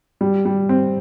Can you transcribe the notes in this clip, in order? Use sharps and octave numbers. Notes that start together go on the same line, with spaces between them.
G3
G3
C4